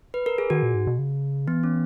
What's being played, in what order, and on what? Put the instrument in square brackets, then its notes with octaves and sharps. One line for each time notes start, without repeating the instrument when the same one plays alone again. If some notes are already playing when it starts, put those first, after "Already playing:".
[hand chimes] B4
A#4
G#4
[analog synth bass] D#3 [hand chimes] F#4
[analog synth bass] A#2
G#2
B2
C#3
[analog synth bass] E3 [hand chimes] B3
[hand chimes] C#4